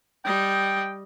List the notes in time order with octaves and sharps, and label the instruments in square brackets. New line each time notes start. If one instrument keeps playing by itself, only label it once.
[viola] G3 D#5 [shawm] G5